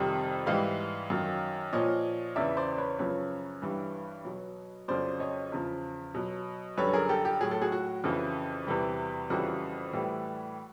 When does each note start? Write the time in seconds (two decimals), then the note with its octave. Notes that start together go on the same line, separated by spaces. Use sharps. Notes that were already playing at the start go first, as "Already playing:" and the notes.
Already playing: F2 C3 D#3 G3
0.46 G#2 E3 G3 D#5 F5
1.10 F#2 D#3 F#3
1.73 A#2 F3 C#5 D#5
2.36 E2 C#3 E3 D5 E5
2.57 C5 D5
2.72 D5
2.78 B4 C#5
2.99 F#2 C#3 F3 B4 C#5
3.62 G2 E3 G3
4.25 B2 F#3
4.88 F2 C#3 F#3 C5 D5
5.20 C#5 D#5
5.52 E2 C#3 F3
6.14 B2 F#3
6.77 F#2 D3 G3 B4 C#5
6.93 G#4 A#4
7.09 G4 A4
7.25 G4
7.41 A2 F#3 G#4
7.51 A4
7.62 F#4 G#4
7.72 F#4
8.04 F2 C#3 E3
8.67 E2 C3 E3 G3
9.30 F2 C#3 E3 G3 F#4
9.93 A2 E3 G3